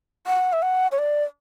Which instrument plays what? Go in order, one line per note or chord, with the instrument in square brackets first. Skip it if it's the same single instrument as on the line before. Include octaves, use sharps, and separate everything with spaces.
[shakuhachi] F#5
E5
F#5
C#5
D5